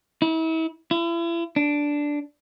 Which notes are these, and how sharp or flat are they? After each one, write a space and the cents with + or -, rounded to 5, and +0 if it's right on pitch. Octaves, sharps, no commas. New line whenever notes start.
E4 -35
E4 +40
D4 -5